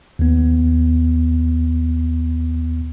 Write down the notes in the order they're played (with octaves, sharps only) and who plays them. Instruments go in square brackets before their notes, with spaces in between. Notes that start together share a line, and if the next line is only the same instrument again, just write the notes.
[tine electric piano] D#2 B3